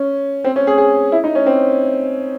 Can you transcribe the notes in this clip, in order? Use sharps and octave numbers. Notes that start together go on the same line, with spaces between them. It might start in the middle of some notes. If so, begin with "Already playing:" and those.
Already playing: C#4
C4
C#4
G#4
G#4
E4
D#4
C#4
C4